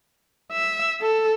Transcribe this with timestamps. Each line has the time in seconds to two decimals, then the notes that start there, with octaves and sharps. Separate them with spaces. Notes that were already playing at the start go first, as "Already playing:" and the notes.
0.52 E5
1.01 A4